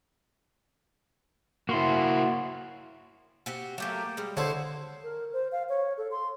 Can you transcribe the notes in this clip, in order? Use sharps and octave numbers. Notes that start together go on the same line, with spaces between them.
A#3 E4 F#4 C6
C4 F#4 G4
F#3 A3 A#3 G4
G3 G#3
D3 D4 E4 C5 C#5 F#5
A#4
C5
F5
C#5
A4
C6